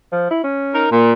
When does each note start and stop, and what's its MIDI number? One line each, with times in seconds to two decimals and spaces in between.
0.12 0.27 53
0.31 0.42 64
0.44 0.86 61
0.73 0.90 63
0.73 0.90 70
0.91 1.13 46